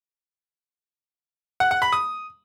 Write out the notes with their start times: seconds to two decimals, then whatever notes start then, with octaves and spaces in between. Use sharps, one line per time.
1.60 F#5
1.71 F#5
1.82 B5
1.92 D#6